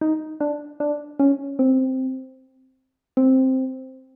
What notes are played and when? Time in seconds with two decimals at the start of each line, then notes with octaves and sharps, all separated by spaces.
0.01 D#4
0.40 D4
0.80 D4
1.19 C#4
1.59 C4
3.17 C4